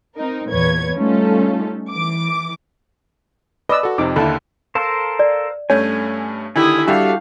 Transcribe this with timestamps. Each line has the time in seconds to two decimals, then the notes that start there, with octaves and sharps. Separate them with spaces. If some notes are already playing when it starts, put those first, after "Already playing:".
0.16 C4 D#4 A#4
0.50 E2 A#2 B4 C#5 G#6
0.94 G3 A3 C#4 D#4 F4 A4
1.92 E3 D6
3.69 B4 D5 D#5 E6
3.83 F#4 A4
3.98 F2 C3 D#4 D6
4.16 D#2 D3 E4 A4 A5 B5
4.75 A4 A#4 C5 F5
5.19 D5
5.70 G2 A3 C#4 C#5 G#5
6.56 D3 D#3 E4 G4 G#5 D#6
6.88 G3 D4 F#4 G4 A4 E5 F5